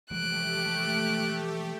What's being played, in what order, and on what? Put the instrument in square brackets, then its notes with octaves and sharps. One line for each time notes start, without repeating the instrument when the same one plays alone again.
[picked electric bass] E3 F3 G#3 [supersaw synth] A3 G4 [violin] F#6 D7